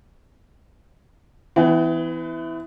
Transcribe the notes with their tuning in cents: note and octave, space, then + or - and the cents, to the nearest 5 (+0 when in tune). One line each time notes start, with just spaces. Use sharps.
E3 +0 B3 +35